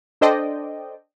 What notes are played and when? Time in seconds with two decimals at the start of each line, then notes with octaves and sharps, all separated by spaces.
0.21 D4 A4 C5 D5 D#5 G5